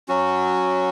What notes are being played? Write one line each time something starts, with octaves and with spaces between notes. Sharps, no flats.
F#3 C#4 F#4